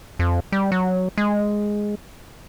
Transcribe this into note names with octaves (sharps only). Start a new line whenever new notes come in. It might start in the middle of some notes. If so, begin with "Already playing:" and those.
F2
G3
F#3
G#3